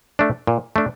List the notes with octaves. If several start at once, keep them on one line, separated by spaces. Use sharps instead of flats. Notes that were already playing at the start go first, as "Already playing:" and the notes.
A3 D4
A#2
A3 D4